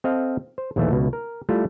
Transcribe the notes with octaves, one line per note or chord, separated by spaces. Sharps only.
C4 A4 D#5 F5
C5
A#1 D#2 A2 E3 A3
C#2 B2
A#4
G3 A3 E4 F4